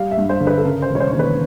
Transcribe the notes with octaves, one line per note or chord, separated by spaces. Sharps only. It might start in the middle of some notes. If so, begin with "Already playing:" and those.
Already playing: G3 F5
E5
G2
C5
D3
B4
A4
C#3 A#4
C5
E1
C#5
C5
D#2 C5
B4